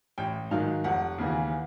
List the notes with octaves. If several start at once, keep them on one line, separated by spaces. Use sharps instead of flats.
A1 G5
G#2 D#3 F#3 F5
F1 F#5
D#2 C#3 E3